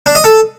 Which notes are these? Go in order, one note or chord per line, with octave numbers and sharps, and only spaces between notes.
D4
D#5
A4